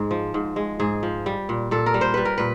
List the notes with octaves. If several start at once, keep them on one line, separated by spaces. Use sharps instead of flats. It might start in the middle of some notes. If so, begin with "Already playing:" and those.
Already playing: G#2 G#3
F3
G#2
G#3
G#2 G#4
F3
G3
A#2
A#2 A4
A#4
G3
C5
G3 B4
A#4
A#2 B4